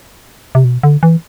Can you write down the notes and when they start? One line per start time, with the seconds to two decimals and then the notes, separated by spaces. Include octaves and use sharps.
0.55 C3
0.64 B2
0.83 D3
1.03 E3